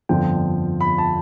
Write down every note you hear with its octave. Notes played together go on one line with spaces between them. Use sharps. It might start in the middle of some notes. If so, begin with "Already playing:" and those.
G1 F2 D3 F3 G5
B5
A5